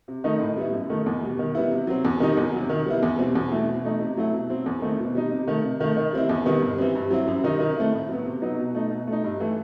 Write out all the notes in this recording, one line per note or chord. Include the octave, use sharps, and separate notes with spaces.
C3
D#3 A3 D#4
A2
G3 B3 E4
F#2
D#3 A3
E2
B2 G3
D#3
G3 B3 E4
C3
F#3 C4
E2
D#3 G3 D#4
E2
C3 F#3
D#3
G3 B3 E4
E2
B2 G3 C4
E2
B2 A3 E4
B2
A3 D#4
C3
F#3 A3 E4
B2
F#3 C4
E2
D#3 A3 C4 E4
B2
G3 D#4
C3
D#3 A3
C3
D#3 A3
D#3
G3 C4 E4
E2
D#3 G3 B3
G2
E3 G3 C4
G2
F#3 C4 E4
F#2
D#3 G3 D#4
D#3
A3 C4 E4
A2
F#3 B3
C3
F#3 B3 D#4
B2
A3 D#4
B2
A3 D#4
G2
E3 A3 E4